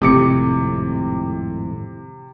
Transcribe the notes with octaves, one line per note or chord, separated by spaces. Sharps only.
G#1 F2 A2 C3 D6 C#7